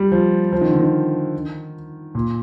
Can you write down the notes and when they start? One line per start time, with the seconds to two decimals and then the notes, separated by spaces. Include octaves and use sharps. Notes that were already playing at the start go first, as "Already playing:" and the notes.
Already playing: G3
0.12 F3
0.53 F3
0.61 D#3
0.70 D3
0.79 D#3
2.15 A#2